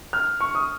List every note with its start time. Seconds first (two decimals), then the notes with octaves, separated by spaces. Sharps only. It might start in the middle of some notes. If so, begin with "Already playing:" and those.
0.13 F6
0.41 C#6
0.55 D#6